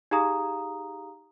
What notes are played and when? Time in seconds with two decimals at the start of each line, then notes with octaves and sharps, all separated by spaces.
0.11 D#4 G4 G#4 F5 A#5 D#6